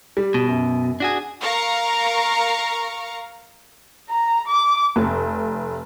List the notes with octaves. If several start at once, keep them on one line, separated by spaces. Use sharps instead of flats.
G3
B2
F#2
D4 F#4 G#4
A#4 F5 A#5 C#6
A#5
D6
F1